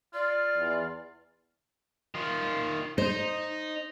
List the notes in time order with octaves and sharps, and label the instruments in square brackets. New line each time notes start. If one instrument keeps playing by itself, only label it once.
[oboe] F4 [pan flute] D5
[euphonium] E2
[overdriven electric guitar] D#3 F4
[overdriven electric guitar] D#4 [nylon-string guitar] C5